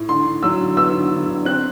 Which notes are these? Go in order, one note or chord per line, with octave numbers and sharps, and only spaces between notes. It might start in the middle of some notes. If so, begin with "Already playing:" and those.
Already playing: A2
D3 C6
D3
F#3 E6
D3
B3 E6
D3
D3
D3
C4 F#6